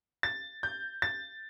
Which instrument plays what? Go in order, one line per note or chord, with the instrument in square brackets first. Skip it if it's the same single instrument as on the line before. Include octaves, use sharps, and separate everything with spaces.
[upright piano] A6
G6
A6